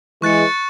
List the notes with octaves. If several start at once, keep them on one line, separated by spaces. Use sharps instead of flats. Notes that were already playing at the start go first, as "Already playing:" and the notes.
E3 G#3 C#6 F#6 A6 C#7